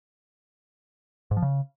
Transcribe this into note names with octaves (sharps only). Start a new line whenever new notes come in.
G#2
F3
C#3